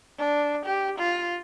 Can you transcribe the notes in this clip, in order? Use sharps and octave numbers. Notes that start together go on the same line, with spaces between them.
D4
G4
F4